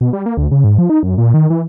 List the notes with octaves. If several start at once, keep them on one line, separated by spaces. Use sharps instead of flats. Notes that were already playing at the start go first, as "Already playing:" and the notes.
B2
G3
A#3
D2
C#3
G#2
F3
D#4
F#2
A#2
D#3
E3